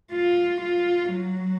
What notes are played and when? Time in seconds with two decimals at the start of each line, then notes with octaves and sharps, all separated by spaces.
0.12 F4
0.61 F4
1.11 F#3